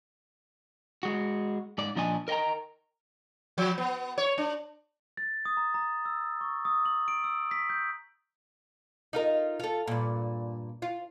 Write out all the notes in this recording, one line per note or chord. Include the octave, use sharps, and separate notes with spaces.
G#3 F#4
G#2 D5
A#2 F3 D4 D#5 G#5
A#4 D#5 F#5 G5 A#5
F3
B3
C#5
D4
A6
D#6
A#5
A#5
E6
C#6
D#6
F#7
D7
E6
B6
G6
D#4 F4 A#4
F4 A4
G2 A#2
F4